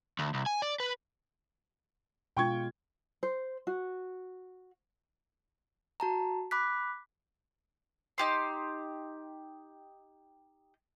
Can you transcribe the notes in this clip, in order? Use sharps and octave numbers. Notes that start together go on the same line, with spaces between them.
D2
C2
G#5
D5
B4
B2 G#3 F4 G5 C#6 G#6
C5
F#4
F#4 A5 A#5
B5 D6 F#6 B6
D#4 G4 C6